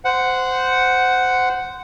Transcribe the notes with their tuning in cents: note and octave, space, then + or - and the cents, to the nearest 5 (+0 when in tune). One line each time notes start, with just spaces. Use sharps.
C5 -15 F#5 +0